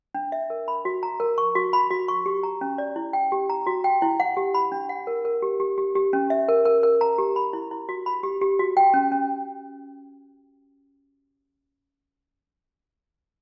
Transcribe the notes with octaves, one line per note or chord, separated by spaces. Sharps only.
D4
E5
A#4
B5
F#4
A#5
A#4
C#6
F#4
B5
F#4
C#6
G4
A#5
C#4
D5
E4
G5
G4
A#5
F#4
G5
E4
F#5
G4
B5
D4
F#5
A#4
A#4
G4
G4
G4
G4
C#4
E5
A#4
A#4
A#4
A#5
G4
B5
E4
E4
F#4
B5
G4
G4
F#4
G5
C#4
C#4